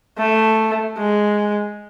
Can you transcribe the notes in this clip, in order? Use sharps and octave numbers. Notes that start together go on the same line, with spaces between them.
A3
G#3